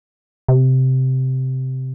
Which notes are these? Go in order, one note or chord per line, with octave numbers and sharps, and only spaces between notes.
C3